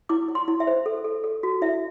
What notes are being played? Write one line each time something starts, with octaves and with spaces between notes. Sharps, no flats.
E4 D6
E4
C6
E4
E5
C5
A4
A4
A4
F#4
E4 E5